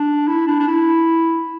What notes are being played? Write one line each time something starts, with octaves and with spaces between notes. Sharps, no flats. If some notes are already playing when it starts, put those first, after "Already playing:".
Already playing: D4
E4
D4
D4
E4